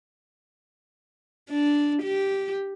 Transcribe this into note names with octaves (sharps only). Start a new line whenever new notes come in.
D4
G4